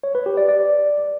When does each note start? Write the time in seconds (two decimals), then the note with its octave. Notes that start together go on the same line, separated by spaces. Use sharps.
0.03 C#5
0.15 B4
0.26 G4
0.37 D5
0.49 D5